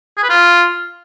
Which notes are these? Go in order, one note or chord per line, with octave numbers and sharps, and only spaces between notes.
G#4
B4
F4